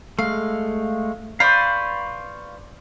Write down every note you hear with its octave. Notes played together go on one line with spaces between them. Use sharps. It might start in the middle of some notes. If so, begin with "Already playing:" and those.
G#3 A3 F5
B4 C5 D5 F5 C#6